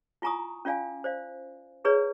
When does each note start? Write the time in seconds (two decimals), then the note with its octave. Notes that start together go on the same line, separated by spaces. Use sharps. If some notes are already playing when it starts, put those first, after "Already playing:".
0.22 E4 F4 G#5 A#5 C#6 D#6
0.65 C#4 F4 D5 F5 G#5
1.04 C5 D5 F5
1.84 E4 G#4 B4 C#5 D5